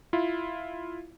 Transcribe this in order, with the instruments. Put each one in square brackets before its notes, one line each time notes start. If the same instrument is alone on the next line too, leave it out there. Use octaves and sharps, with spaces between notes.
[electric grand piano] E4 F4